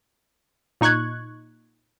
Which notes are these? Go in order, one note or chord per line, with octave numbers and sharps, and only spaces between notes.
A#2 D#4 C#6 F#6 G#6